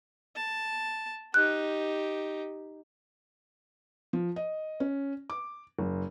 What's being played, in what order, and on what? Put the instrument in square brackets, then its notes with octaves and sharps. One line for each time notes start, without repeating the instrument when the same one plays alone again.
[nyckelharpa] A5
[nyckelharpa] D#4 G4 [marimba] F#6
[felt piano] F3
D#5
C#4
D6
F#1